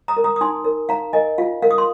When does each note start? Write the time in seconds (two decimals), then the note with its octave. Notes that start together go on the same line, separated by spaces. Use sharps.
0.08 A#5 D#6
0.17 A#4
0.24 A#5 D#6
0.36 D#6
0.41 D#4 G#5 C6
0.65 A#4
0.89 D#4 F5 A#5
1.13 A#4 D#5 G#5
1.38 F4 F5
1.62 A#4 F5
1.71 D#6
1.78 C6